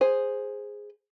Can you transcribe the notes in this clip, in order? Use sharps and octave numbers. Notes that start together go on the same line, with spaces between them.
G#4 C5